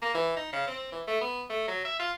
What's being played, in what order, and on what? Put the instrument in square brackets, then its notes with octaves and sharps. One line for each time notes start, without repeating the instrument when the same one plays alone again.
[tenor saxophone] A#3
E3
D#4
C#3
C4
E3
A3
B3
A3
F#3
E5
F4